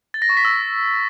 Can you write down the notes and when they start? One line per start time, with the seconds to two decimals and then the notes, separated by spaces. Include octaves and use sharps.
0.14 A6
0.22 A#6
0.29 C#6
0.37 B6
0.45 E6